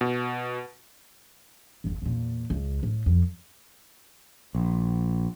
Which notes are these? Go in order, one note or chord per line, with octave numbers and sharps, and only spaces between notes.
B2
G1 E2
E2 A#2
C#2
A2
F2
A#1